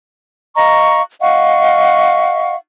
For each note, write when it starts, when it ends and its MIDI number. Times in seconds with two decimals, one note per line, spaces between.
0.56 1.01 75
0.56 1.01 77
0.56 1.01 82
0.56 1.01 85
1.21 2.56 75
1.21 2.56 77
1.21 2.56 78
1.21 2.56 85